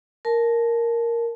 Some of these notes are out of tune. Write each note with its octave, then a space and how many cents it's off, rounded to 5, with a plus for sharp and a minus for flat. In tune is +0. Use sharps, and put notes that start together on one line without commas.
A#4 +0 A5 -20